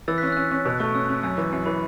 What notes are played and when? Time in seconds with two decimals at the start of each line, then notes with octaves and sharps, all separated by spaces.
0.08 E3 E6 A6
0.18 F#6 B6
0.23 C#4 E6 A6
0.32 F#6
0.37 C#4 E6
0.51 C#4
0.65 B2 E6
0.80 A3 C#6
0.94 C#4 E6
1.09 C#4 E6
1.23 F#2 E6
1.38 E3
1.52 F#2
1.66 E3 B5